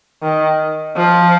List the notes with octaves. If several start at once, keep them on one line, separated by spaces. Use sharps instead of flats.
D#3
F3